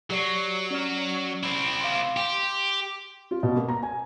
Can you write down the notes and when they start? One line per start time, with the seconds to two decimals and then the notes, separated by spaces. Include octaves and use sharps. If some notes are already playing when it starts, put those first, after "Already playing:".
0.10 F#3 G4 D5 C7
0.71 C#4 D5 F6
1.43 C4 E4
1.81 F5 C6
2.17 G4 C6
3.31 F4
3.43 B2
3.56 A#3
3.69 A#5
3.83 G#5